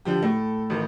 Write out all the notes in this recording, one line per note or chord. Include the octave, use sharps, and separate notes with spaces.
D3 F3 G4
A2 A4
A1 D#3